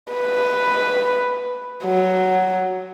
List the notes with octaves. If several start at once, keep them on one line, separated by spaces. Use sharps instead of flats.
B4
F#3